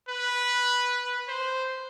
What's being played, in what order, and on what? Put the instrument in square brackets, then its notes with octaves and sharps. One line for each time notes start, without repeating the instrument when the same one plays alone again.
[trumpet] B4
C5